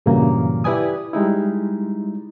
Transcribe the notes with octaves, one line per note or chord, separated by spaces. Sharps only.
G2 A#2 C#3 E3 F#3 A#3
E4 G4 B4 D5 G#5 D#6
G3 G#3 D#4 E4